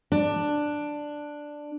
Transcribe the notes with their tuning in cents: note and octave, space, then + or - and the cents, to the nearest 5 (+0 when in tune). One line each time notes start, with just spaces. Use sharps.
D4 +5